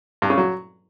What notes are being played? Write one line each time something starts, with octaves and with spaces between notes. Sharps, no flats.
G2
C#3
F#3